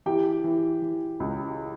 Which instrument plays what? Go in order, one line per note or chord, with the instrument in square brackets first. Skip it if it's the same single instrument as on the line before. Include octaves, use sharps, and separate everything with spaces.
[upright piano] E3 G4 G5
E3
E3
C#2